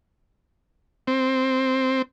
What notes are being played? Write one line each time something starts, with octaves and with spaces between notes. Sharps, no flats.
C4